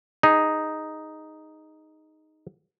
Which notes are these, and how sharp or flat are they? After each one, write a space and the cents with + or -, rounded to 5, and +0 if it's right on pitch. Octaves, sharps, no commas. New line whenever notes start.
D#4 +0 G#4 +0